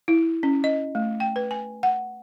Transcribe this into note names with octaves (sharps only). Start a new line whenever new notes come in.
E4
C#4
D#5
A3
G5
B4
G#5
F#5